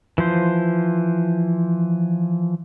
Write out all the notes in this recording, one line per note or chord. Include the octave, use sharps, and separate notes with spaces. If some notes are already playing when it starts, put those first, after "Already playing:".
E3 F3 C5